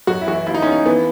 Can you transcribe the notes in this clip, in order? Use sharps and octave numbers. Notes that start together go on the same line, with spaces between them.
F#2 F#4
E4
E3 F#4
E4
D#2 E4
D#4
C#4
D#2
D#4
E3 B3